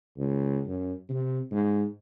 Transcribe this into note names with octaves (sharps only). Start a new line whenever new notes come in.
C#2
F#2
C3
G#2